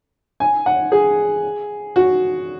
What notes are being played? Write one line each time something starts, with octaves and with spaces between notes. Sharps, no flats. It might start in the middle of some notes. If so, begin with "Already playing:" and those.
G#5
F#5
G#4
F#4